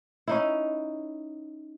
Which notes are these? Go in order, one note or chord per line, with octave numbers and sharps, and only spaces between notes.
C#4 D#4 E4